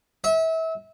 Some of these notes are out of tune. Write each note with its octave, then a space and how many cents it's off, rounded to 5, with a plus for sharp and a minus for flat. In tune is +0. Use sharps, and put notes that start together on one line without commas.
E5 -30